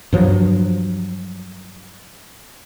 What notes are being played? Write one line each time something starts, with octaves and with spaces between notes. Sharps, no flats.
G2 F3 F#3